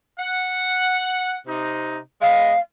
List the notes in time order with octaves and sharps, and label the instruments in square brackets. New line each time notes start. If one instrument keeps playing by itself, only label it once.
[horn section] F#5
C3 D#4
[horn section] G#3 B3 D#5 [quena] F5